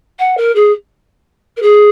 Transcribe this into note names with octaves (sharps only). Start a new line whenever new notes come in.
F#5
A#4
G#4
A#4
G#4